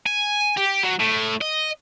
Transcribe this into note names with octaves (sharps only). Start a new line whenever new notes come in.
G#5
G4
F#3
A2
D#5